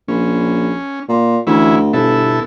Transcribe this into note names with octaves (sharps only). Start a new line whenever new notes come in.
A#1 C#4
A#2
D2 E3 C#4 E4
G1 B2 E4 A4